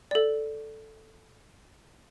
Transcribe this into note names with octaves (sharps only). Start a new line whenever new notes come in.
A4 D5